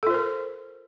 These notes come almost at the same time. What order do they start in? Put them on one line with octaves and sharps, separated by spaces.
A4 F4 C5 A#4